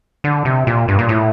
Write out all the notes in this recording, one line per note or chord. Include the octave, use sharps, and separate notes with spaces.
D3
C3
A#2
G2
A#2
A2